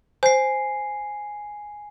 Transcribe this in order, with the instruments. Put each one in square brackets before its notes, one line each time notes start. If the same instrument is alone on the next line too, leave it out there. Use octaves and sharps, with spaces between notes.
[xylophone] C5 [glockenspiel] G#5 C7